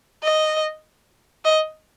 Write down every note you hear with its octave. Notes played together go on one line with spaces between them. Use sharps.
D#5
D#5